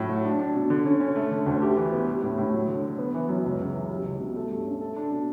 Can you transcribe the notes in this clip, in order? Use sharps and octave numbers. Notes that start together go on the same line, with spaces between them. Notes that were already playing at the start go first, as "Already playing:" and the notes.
Already playing: A2 F#3
F#4
D4
D4
B2
D3
C#4
C#4
A3
D3
D2
G4
E3
B3
G3
A2
A2
F#3
D3
D3
B3
E3
F#2
C#2
C#3
E3
G3
C#2
B2
A3
G2
C#4
A4
D4
B2